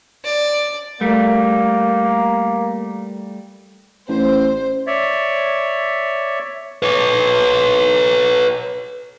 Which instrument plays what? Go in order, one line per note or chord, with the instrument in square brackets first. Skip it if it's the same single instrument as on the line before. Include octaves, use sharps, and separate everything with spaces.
[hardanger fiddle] D5
[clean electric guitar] G3 A3 [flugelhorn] A#3
[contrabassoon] A1 [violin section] C5
[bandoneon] C#5 D5 E5
[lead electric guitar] B4 C#5